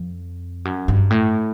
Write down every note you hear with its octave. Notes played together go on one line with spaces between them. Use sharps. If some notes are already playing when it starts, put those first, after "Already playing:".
Already playing: F2
F#2
G2
A2